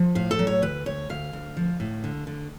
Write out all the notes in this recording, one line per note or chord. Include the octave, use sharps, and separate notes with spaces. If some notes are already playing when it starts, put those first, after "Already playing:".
Already playing: F3
A2 F5
A4
F#3
C#5
D2 B4
D2 C#5
D2 F5
D2
F3
A2
D3
D3